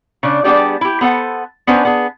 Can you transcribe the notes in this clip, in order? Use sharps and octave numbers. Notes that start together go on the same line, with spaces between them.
C#3 D4
G3 B3 D4 G4 G#4 D5
E4 G4
B3 A4 C5 F#5
B3 C#4 D4 B4 C5
B3 G#4